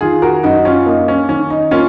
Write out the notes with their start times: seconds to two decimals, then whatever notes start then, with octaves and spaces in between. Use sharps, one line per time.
0.01 D#3 F4 G#4
0.22 F#4 A#4
0.43 F#2 D#4 F#4
0.65 C#4 F4
0.86 A#3 D#4
1.08 C#4
1.28 D#3 C#4
1.50 D#4
1.71 A#3 C#4 F4